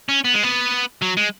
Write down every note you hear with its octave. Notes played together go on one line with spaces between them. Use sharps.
C#4
B3
G#3
B3
F#3
G#3